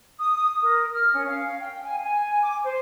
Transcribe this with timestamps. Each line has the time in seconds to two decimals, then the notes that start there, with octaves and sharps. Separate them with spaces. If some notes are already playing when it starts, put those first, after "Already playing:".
0.19 D#6
0.62 A#4
0.93 F6
1.13 C#4
1.26 F5
1.59 G5
1.84 G#5
2.03 G#5
2.43 D6
2.63 C5